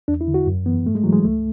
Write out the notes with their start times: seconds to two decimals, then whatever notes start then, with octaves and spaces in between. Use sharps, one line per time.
0.08 E2 D4
0.21 E4
0.28 D3
0.34 F#4
0.47 F#2
0.66 E3 B3
0.86 G#2 A3
0.95 G#3
1.04 E3 F#3
1.13 G#3
1.25 C#2 A3